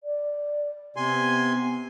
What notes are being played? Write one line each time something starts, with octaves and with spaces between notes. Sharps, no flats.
D5
C3 B3 G#5 C6